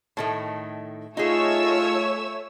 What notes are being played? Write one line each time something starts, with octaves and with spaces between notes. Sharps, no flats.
A2 D#3 A3
A3 D#4 F4 G#4 C#5 E6